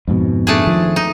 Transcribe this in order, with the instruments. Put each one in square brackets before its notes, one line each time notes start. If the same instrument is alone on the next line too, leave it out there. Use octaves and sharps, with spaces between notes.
[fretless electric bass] F2 G#2 B2
[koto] A3 D4 G#4
[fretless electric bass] D#3 F3
[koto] D#4